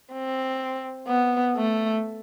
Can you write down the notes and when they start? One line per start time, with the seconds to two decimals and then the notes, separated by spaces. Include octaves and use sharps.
0.13 C4
1.08 B3
1.56 A3